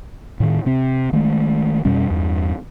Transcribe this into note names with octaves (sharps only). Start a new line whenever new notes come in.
A2 D#3
C3 C4
D#3 G#3 A3
F2 B2 G3 C#4
E2 G2